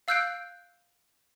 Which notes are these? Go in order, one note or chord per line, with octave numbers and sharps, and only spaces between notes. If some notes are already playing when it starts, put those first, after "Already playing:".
F5 E6 F#6 G6 C7 D7